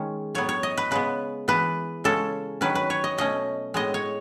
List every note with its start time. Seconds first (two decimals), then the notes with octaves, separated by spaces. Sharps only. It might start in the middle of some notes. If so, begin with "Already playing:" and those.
Already playing: D#3 G#3 C#4
0.35 A2 F#3 B3 C#5
0.49 C#5
0.63 D#5
0.77 B4
0.91 C#3 G#3 B3 B4
1.48 E3 B3 B4
2.04 C#3 G#3 C#4 A4
2.61 D#3 F#3 C#4 B4
2.75 B4
2.90 C#5
3.04 D#5
3.18 B2 A3 C#4 D#5
3.74 A2 G#3 B3 D#5
3.94 C#5